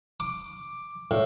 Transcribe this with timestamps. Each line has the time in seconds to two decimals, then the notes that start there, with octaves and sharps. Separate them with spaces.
0.20 D6
1.11 A2